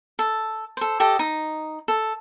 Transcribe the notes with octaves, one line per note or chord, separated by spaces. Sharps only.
A4
A4 C5
G4 A4 D#5
D#4
A4